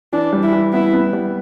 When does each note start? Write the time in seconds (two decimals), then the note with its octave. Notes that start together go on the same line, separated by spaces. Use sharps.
0.13 E3 D4
0.33 G3
0.43 E4
0.53 E3
0.73 B3 E4
0.93 B3
1.13 G3